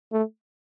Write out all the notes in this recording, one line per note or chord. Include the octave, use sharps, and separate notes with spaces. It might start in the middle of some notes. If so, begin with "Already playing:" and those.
A3